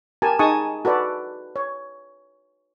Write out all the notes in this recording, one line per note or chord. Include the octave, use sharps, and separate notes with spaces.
G4 A#4 G#5 A5
D#4 G#4 G#5 A5 C#6 D#6
F#4 A4 B4 D5
C#5